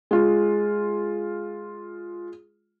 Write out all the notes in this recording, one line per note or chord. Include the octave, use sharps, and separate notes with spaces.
G#3 F4